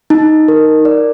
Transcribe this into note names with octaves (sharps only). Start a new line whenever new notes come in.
D#4
A#4
D5